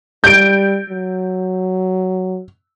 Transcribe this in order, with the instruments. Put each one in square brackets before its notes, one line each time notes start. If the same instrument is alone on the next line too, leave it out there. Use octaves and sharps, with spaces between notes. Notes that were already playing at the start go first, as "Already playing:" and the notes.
[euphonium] G3 [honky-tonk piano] G6 D7
[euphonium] F#3